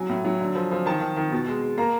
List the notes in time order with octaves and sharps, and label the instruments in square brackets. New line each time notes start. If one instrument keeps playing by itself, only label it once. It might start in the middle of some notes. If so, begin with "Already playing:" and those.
Already playing: [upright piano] F#3 G#5
A2
F#3
D3
F3
F3
D#3 A5
D#3
D#3
B2
G#3
G#3
A#3 A#5